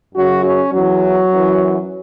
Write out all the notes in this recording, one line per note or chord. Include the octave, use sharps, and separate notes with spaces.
F#2 C#3 F#3 F#4
C#4
E2 E3 F#3
F#2 E3